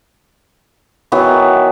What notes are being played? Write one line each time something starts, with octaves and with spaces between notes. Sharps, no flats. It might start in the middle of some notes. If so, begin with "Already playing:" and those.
D#3 E3 F#3 B3